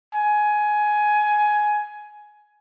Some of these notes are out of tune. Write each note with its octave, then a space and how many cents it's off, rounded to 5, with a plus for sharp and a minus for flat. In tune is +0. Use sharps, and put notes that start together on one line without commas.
G#5 +15